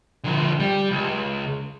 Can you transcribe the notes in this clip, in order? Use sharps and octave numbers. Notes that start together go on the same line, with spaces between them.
D3 F3
G3
C#2